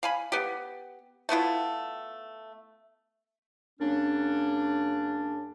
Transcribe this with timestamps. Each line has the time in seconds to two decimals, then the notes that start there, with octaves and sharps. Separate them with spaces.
0.03 F5 G#5 B5
0.32 B3 G4
1.29 A3 B3 E4 F4
3.80 F#2 C#3 A#3 C#4 D4